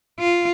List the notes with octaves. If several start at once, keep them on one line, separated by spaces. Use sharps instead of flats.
F4